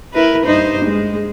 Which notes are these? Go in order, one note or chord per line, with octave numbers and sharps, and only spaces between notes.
E4 A#4 B4
G2 D#4 C5
G#3